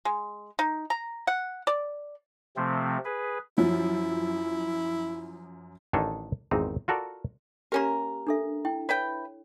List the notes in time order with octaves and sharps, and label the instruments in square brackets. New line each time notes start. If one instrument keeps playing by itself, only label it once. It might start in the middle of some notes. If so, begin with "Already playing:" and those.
[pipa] G#3
D#4
A#5
F#5
D5
[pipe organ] C3 F3 A3 C4
G#4 B4
[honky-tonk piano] F#2 F3 [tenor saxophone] E4
[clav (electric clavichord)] A1 D#3 D4 D#4 A4 G#5
G#1 E2 A#2 C4 D#4
F4 F#4 A4 A#4 D5
[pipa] A#3 C#4 A#4 [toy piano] G4 A#5
[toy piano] D4 A4 E5
E4 G5
[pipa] E4 B4 G5 [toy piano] C#5